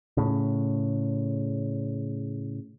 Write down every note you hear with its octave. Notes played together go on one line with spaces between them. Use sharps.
A2 C#3